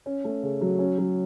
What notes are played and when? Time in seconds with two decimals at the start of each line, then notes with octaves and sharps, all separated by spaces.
0.06 C#4
0.24 A3
0.43 C#3
0.61 F#3
0.79 C#4
0.98 F#3